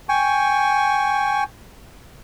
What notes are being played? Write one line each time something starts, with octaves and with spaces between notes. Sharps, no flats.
G5 G#5 C#6